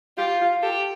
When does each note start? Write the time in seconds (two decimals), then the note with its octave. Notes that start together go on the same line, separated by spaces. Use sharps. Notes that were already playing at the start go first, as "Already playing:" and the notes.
0.17 F4 G4
0.41 F4
0.62 G4 A4